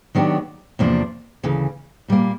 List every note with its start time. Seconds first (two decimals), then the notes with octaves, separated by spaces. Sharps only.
0.15 D#3 F#3 B3 D4 G4
0.79 E2 C3 F3 A#3 D4
1.43 D2 C#3 E3
2.08 A#2 G3 A#3